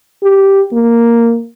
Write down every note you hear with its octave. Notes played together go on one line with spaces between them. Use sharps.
G4
A#3